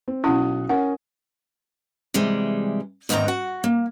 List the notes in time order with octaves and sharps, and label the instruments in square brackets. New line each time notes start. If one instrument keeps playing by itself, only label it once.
[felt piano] C4
[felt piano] B1 F#5 D#6 [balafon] C#4 E4
[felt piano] C#4 A#4 [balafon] F#5
[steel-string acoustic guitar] C3 E3 G3 G#3
E2 G#2 C3 D#3 C4 A#5
F#4 F#5
A#3